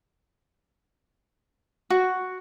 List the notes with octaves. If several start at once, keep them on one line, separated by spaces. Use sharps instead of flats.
F#4